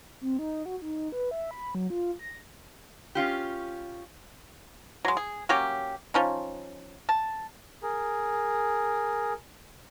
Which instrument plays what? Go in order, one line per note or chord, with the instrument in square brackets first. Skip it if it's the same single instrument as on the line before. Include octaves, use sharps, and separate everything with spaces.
[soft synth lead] C4
D#4
F#4
D#4
B4
E5
B5
F#3
F4
A#6
[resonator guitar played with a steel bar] C#4 F4 G4
[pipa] F#3 G#3
G#4
F#3 A#3 C#4 G4
F3 C#4 D#4
A5
[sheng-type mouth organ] G#4 A#4